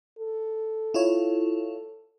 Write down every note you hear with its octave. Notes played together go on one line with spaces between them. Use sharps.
A4
E4 F4 C#5